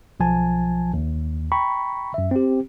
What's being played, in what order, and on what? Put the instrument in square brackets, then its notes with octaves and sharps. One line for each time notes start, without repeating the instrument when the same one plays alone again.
[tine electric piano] B1 F3 G#5 A5
D#2
G5 A#5 B5 C#6
F#2 E5
C4 G4